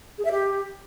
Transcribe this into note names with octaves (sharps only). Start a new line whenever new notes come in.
G#4
E5
G4